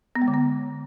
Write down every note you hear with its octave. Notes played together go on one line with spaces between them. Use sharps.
B3
G#3
D3
B3